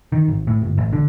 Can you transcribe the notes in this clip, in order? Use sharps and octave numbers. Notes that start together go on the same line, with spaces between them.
D#3
G#1
A2
G1
A1
D3